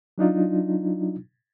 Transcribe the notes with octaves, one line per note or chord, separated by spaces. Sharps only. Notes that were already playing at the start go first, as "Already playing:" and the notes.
F#3 D4 D#4 F4